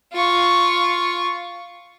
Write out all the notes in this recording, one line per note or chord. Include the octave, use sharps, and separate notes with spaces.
F4 C#6